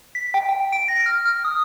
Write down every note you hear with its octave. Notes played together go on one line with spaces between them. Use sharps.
B6
G5
G5
D7
A#6
F6
F6
D#6